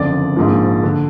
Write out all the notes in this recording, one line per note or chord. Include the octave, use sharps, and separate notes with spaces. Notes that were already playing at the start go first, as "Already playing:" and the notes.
Already playing: F#1 F2 D3 D5
A#1 G#2 F3 A#3
D3